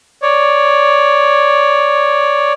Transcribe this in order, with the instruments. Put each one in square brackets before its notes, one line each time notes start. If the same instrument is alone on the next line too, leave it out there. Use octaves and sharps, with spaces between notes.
[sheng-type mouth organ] C#5 D5